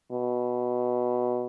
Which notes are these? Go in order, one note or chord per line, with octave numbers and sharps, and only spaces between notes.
B2